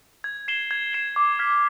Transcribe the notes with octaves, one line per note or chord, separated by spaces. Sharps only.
G#6
C7 E7 G7
G#6
C7 E7 G7
D6
F6 G#6 B6